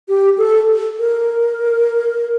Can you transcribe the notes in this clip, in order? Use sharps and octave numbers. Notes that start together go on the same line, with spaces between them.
G4
A4
A#4